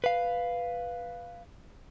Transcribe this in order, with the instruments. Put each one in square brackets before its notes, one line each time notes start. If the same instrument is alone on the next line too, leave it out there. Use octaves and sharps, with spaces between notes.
[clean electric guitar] B4 F5